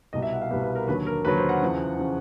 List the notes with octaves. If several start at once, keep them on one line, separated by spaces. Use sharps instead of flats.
C2 B2 G3 D#5
E5
F#5
F5
C2 B2 G3 B4
B4
A#4
D#2 D3 F#3 B4
A#4
D#2 D3 F#3 B4
C5
F#5
E2 C#3 F3
C#3 F3